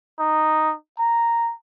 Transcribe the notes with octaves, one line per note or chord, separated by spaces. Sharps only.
D#4
A#5